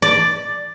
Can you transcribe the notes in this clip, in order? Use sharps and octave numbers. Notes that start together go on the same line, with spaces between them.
D5